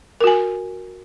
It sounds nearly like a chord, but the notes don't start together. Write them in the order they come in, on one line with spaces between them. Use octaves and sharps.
A#4 F#4 G#5